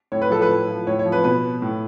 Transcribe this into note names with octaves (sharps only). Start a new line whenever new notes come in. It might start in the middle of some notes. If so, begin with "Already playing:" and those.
A2 C#5
B4
F3 A4
B4
A2
F3
A2 C#5
C#5
F3
B4
B2 B4
A2